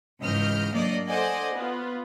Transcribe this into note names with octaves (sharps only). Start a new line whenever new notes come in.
C#2 G#2 E3 D#5 F6 G6
F#3 A3 A#3 D4 D5 D#5
A4 C5 D5 D#5 F#5 G#5
B3 F4